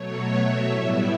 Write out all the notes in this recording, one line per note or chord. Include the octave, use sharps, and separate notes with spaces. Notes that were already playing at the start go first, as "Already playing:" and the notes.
Already playing: B2 F#3 A3 C#5
E5
A2 G3 B3 E4